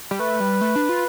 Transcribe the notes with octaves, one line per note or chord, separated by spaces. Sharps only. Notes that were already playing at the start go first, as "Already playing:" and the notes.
G3
A3 B4
G3
A3
D4
F4